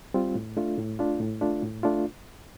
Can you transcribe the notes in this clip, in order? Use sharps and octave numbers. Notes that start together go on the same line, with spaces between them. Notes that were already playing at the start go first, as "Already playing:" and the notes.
G3 C4 F4
A2
A3 D4 F4
A2
A3 D4 F4
A2
A3 D4 F4
A2
A3 D4 F4